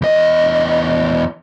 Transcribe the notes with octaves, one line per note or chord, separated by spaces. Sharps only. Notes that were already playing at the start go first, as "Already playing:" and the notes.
E2 D#5